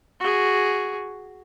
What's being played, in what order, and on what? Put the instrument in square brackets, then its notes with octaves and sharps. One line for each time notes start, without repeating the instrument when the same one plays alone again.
[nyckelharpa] F#4 G#4